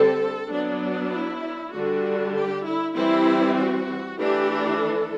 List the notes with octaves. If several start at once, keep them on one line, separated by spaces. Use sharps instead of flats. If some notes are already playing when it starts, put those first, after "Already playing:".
Already playing: D3 G3 C4 A4
F#3 B3 D4
E4
D3 G3 D4 F#4
G4
E4
E3 G3 C4 E4
F#4
E3 A3 D4 G4
A4